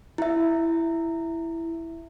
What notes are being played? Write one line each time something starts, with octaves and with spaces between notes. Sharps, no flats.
E4 E5